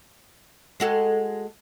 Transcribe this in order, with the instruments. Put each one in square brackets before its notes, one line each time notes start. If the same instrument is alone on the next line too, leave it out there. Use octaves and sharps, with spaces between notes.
[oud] G#3 F#4 A4